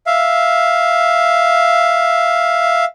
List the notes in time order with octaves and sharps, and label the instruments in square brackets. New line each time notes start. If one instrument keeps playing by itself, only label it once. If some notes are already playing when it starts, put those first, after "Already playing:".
[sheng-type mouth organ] E5 F5